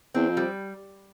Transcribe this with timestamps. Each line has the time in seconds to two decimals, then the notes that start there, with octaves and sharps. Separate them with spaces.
0.14 E2 C4
0.29 F2
0.37 G3